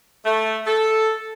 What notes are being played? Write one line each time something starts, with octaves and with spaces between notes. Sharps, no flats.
A3
A4